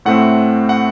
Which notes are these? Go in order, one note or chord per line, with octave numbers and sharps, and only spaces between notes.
A2 A3 C4 F#5
F#5